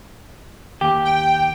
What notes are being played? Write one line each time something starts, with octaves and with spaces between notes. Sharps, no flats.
D#2 G4
G5